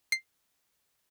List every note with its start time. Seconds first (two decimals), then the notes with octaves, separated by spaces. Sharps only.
0.12 C7